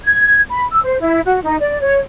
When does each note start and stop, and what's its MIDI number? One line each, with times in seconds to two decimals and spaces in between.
0.05 0.40 92
0.50 0.66 83
0.72 0.80 88
0.84 0.99 72
1.00 1.21 64
1.25 1.39 66
1.44 1.57 63
1.60 1.80 74
1.81 2.00 73